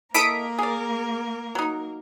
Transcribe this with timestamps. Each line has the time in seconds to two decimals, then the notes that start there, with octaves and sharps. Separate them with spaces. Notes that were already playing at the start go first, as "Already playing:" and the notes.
0.14 A#3 E4 A4 A#4 D#5 D#6 B6 D7
0.59 G#4 D5
1.55 F#3 D#4